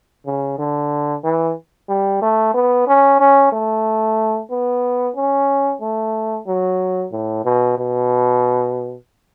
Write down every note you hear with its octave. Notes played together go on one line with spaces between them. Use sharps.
C#3
D3
E3
G3
A3
B3
C#4
C#4
A3
B3
C#4
A3
F#3
A2
B2
B2